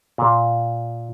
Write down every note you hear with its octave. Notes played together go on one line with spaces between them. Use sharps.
A#2